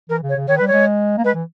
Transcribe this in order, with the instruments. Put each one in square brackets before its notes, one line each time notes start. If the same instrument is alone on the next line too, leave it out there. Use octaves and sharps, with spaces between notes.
[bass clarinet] E3 [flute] A#4
[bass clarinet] C#3
[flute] C#5
[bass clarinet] C#3
[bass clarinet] D#3 [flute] C#5
[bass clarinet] G3 [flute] B4
[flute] C#5
[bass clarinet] G#3
A#3
[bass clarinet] G#3 [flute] B4
[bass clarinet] E3